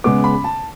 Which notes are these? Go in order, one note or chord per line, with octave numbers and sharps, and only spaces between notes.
C#3 G#3 B3 D6
B5
A5